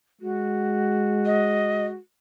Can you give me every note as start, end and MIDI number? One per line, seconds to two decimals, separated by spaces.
0.21 1.97 56
0.21 1.94 66
1.26 1.85 75